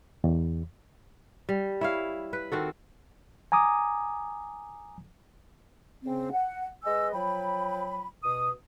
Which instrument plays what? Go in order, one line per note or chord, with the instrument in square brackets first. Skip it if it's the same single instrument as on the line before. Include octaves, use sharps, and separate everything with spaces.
[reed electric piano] E2
[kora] G3
E4 C#5 F5
B4
D#3 C4 F#4 A4
[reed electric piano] G#5 A#5 D6 D#6
[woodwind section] C#3 C4
F#5
G#3 B4 D#5 G#5 E6
F3 F#3 G5 B5
B2 D#6